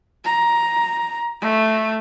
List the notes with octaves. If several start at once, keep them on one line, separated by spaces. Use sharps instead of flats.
A#5
A3